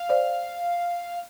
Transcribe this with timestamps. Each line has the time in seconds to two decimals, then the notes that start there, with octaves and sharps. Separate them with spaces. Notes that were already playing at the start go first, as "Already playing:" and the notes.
Already playing: F5
0.09 C5 D5